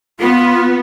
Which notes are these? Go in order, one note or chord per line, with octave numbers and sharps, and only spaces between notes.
B3 F4